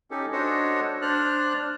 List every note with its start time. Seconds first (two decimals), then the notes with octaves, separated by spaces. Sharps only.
0.11 C#4 D#4 G4 A4
0.33 D4 F#4 A4 C5 C#5 D#5
1.02 D4 C5 D5 F6 F#6